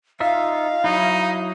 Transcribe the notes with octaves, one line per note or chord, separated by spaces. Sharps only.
D#4 F4 E5 F5
F#3 D#4 E4